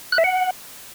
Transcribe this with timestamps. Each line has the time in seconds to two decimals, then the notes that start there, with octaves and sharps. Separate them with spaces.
0.12 F#6
0.18 E5
0.24 F#5